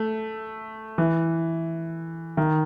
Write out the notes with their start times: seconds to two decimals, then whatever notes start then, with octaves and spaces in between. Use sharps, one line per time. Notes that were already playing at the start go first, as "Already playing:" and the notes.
Already playing: A3
0.98 E3
2.37 D#3